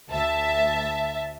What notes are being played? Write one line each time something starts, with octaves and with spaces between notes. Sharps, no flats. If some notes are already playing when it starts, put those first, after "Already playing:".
D2 E5 A5